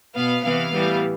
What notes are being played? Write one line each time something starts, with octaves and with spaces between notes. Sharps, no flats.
B2 B3 F5
C3 E3 B3 F5
A2 E3 G3 B3